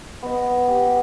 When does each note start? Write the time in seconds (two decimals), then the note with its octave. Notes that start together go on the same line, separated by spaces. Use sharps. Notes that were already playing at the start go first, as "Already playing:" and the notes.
0.23 B3 D#5
0.68 G4